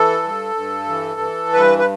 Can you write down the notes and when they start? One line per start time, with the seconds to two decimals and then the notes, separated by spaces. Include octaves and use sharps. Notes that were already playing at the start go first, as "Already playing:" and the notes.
Already playing: E3 A4
0.22 G2
0.55 G2
0.88 E3
1.20 E3
1.53 G2 B4
1.78 B4